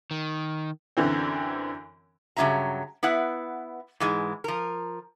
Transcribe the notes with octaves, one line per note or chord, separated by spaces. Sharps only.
D#3
F#2 D3 E3 C4
G2 C#3 F#3 E4 E5 A#5
B3 E4 B4 F#5
G#2 E3 G#3
F3 A#4